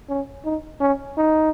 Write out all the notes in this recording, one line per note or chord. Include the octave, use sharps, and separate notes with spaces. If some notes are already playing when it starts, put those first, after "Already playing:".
C#4
D#4
C#4
D#4